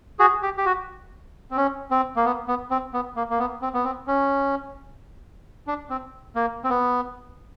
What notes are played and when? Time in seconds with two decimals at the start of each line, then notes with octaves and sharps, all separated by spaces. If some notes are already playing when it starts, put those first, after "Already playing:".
0.19 F#4 G#4
0.43 G4
0.58 G4
0.66 F#4
1.51 C4
1.57 C#4
1.91 C4
2.16 A#3
2.25 B3
2.48 B3
2.70 C4
2.94 B3
3.16 A#3
3.30 A#3
3.39 B3
3.62 C4
3.74 B3
3.84 C4
4.07 C#4
5.67 D4
5.90 C4
6.36 A#3
6.64 C4
6.70 B3